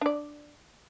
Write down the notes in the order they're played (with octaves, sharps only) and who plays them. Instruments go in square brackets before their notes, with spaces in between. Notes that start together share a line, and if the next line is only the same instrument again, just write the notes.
[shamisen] D4 D5